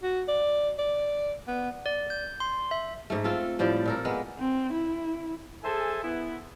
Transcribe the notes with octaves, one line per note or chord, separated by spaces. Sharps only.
F#4
D5
D5
B3
D5
G6
C6
E5
G#2 A3
C4 F4 A4
A2 F3 G3 D5
A#2 A4 A#4
G#3 A#3 B3
C4
E4
G#4 A4 C5 E5 G#5 A5
B3 E4